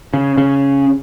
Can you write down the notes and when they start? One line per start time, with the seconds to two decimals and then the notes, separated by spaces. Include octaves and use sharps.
0.14 C#3
0.37 C#3